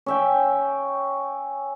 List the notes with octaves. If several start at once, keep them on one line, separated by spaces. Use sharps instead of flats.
C#4 E5 G5